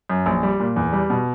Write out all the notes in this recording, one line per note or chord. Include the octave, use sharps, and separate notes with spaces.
F#2
A#1
G3
A#2
E2
G3
B2